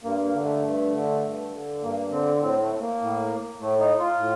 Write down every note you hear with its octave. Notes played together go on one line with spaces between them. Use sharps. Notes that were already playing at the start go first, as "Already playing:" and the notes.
G2 A#3
A#3
D3
A3
G2
D3
G2
D3
G2 A#3
D3 C4
A2 C4
A3
A#3
A2
A2 A3
D#4
F4
A2